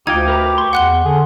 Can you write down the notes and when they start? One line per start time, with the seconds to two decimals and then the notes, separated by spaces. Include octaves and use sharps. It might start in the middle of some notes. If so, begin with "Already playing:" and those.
0.07 D2 D#4 F4 G4 G5 G#6
0.28 A#4 B4 A#5
0.58 C6 C#6
0.73 E2 F#5 F#6 G7
1.04 D3 G#4